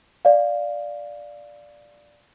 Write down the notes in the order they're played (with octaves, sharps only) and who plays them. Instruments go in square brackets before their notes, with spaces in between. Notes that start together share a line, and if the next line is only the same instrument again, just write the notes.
[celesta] D5 F5